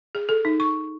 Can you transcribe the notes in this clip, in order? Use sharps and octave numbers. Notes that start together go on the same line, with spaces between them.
G#4
A4
D#4
C#6